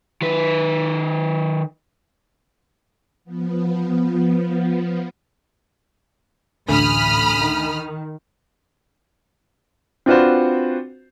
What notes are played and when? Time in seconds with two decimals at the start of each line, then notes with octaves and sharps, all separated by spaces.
0.22 D#3 B4
3.25 F3 B3
6.68 A1 D2 B5 D#6 F6
7.39 D#3
10.06 C4 D4 F4 F#4 B4 C5